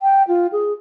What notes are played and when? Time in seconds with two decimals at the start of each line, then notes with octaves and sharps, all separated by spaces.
0.02 G5
0.28 F4
0.52 G#4